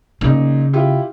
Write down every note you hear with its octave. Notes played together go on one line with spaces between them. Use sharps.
A#2 C#3 D#4
E4 F4 G4